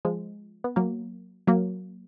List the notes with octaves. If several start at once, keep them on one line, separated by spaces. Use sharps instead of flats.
F3 G#3
B3
F#3 A#3
F#3 A#3